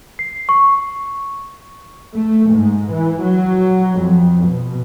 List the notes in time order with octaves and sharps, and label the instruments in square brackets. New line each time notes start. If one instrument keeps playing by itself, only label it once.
[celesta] C7
C#6
[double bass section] A3
G#2
E3
F#3
F2
B2